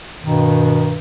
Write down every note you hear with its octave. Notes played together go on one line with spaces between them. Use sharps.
G2 B2 D#3